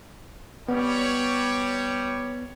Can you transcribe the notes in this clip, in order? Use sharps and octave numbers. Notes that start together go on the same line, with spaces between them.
G3 B3 C#5